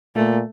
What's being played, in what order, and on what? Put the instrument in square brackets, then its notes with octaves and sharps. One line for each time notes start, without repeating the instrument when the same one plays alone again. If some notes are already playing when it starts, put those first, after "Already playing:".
[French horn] A#2 [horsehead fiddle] A3